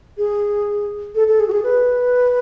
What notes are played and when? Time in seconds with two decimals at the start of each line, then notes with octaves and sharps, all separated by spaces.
0.18 G#4
1.15 A4
1.28 A4
1.40 G#4
1.48 F#4
1.51 G#4
1.63 B4